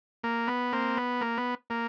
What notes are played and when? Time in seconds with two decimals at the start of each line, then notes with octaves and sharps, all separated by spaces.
0.24 A#3
0.48 B3
0.73 A#3 C4
0.97 B3
1.21 A#3
1.38 B3
1.70 A#3